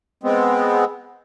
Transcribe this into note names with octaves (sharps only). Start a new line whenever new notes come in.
G#3 B3 C4